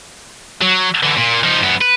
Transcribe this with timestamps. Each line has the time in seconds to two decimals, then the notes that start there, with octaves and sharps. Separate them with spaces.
0.62 F#3
1.03 D3 E3
1.17 A#2
1.44 F3 D#4
1.62 F#2 B3
1.81 B4